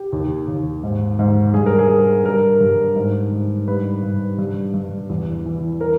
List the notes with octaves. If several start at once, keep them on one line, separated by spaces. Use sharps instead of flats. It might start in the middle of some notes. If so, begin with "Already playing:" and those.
Already playing: G4
D#2
D#2
G#2
G#2
G2 G#4
A#4
G#4
G2
G2 A#4
G2
G#2
G#2
G2 B4
G2
G2
G2
E2
E3
A#4